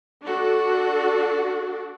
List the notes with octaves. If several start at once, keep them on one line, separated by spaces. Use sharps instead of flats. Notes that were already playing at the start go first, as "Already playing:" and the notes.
D4 F#4 A4